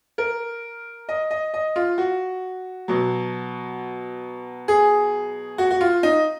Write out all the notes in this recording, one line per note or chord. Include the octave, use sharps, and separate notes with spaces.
A#4
D#5
D#5
D#5
F4
F#4
B2 F#3
G#4
F#4
F#4
F4
D#4